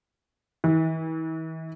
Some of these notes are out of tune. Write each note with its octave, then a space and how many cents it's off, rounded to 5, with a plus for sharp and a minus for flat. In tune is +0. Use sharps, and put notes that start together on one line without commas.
E3 -45